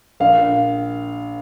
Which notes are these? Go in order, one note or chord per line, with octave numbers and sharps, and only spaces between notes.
A#1 F5